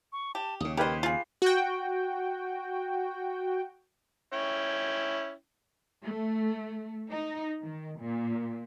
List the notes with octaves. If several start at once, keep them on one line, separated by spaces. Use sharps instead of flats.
C#6
G4 A5
D#2 C#3 D#6
D#3 G4 B4 C5 D#5 G#6
F4 G#4 C7
F#4 G5
C#4 E4 G5
A3
D#4
D#3
A#2